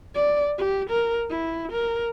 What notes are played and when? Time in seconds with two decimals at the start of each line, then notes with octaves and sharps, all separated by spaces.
0.15 D5
0.58 G4
0.90 A#4
1.30 E4
1.72 A#4